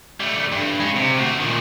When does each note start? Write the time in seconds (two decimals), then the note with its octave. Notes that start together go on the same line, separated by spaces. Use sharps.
0.20 G3 A3
0.52 G2
0.80 G#3 C#4
0.95 C3
1.19 A3 F#4
1.38 A#2 D#3